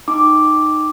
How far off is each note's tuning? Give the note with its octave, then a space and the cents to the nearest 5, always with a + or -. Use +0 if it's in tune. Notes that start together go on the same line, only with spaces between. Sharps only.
D#4 -15 G5 +0 D6 +0